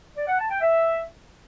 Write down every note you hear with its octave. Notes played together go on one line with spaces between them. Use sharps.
D5
F#5
A5
G5
E5